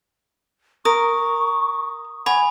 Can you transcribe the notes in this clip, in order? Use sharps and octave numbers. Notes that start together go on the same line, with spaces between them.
A#4 C#6 D#6
C#5 F#5 G#5 B5